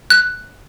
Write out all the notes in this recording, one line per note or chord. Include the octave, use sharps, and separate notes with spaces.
F#6